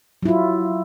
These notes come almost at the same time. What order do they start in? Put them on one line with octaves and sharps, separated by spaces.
F#3 E4 F4